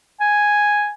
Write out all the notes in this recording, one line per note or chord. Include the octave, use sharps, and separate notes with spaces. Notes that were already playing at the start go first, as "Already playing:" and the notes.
G#5